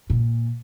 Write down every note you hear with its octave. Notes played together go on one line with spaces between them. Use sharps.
A#2